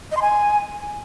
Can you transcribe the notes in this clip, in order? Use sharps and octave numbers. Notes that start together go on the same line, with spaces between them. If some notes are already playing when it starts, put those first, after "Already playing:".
D#5
C6
G#5